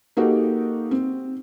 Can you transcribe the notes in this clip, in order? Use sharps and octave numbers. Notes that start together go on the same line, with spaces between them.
A#3 D#4 F#4 G4 A4
C4